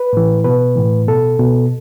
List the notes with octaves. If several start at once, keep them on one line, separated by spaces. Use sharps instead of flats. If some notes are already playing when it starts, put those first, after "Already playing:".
Already playing: B4
A2 E3
B2 B4
A2 E3
B2 A4
B2